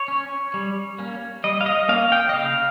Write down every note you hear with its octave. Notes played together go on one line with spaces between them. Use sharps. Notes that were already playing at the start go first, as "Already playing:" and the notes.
Already playing: C#5
C#4
G3
A#3 C#4
G3 D#5
F5
D#5
A#3 C#4 F5
G5
D#5
C#3 F5